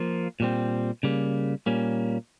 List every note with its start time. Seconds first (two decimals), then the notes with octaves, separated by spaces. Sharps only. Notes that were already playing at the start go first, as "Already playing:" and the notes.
Already playing: F3 A#3 F4
0.40 A#2 G3 C4
1.03 C#3 G3 A#3
1.66 A#2 G3 A#3 C#4